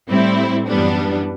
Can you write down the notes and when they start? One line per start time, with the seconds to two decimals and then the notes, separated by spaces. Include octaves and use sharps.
0.09 A2 G3 C4 E4
0.67 F#2 E3 G3 B3 D4